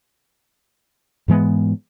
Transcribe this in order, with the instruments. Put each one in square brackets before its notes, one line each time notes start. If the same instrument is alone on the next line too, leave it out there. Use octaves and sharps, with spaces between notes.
[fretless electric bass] G#2 E3 G#3 B3